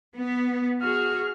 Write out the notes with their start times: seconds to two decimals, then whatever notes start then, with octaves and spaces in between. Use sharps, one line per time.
0.15 B3
0.81 F#4 G#4 F6